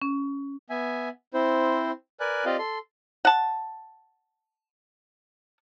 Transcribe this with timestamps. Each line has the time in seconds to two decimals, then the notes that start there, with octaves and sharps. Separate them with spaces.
0.02 C#4
0.70 B3 E5 G#5
1.34 C4 E4 C5
2.20 A#4 B4 D5 G#5 F#6
2.45 C4 F4 G4 D5 D#5 F5
2.58 A4 C6
3.25 F#5 A5